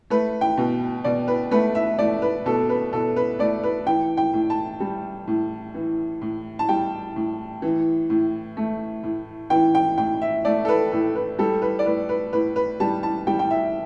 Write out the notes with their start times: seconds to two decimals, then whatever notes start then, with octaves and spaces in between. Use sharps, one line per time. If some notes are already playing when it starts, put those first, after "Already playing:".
0.10 A3 B4
0.41 G5
0.57 B2
1.04 B2 D5
1.28 B4
1.51 A3 B4
1.75 E5
1.99 A3 D5
2.22 B4
2.46 B2 A4
2.69 B4
2.93 B2 A4
3.16 B4
3.39 A3 D5
3.63 B4
3.86 E3 G5
4.17 G5
4.33 A2
4.50 A5
4.80 G3
5.27 A2
5.74 E3
6.21 A2
6.59 A5
6.69 G3 G5
7.16 A2
7.62 E3
8.10 A2
8.57 A3
9.03 A2
9.50 E3 G5
9.75 G5
9.98 A2 G5
10.22 E5
10.45 A3 D5
10.65 A4
10.69 B4
10.92 A2 A4
11.16 B4
11.39 G3 A4
11.62 B4
11.79 D5
11.86 A2 B4
12.09 B4
12.33 A2 B4
12.56 B4
12.80 G3 A5
13.03 A5
13.27 G3 G5
13.39 G5
13.51 E5